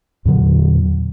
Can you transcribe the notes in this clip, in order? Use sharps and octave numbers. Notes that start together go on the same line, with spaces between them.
E2 A#2 D3 F#3